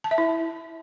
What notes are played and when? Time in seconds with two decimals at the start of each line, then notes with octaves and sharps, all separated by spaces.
0.04 A5
0.11 E5
0.18 E4